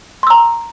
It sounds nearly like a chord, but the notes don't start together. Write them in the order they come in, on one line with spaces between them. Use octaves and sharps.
C6 E6 A#5